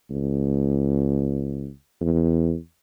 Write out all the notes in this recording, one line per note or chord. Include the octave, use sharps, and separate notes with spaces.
C#2
E2